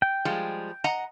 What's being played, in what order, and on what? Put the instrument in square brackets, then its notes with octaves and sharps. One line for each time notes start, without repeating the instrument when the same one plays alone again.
[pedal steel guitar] G5
[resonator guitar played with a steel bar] F3 G3 G#3
D#5 F#5 A#5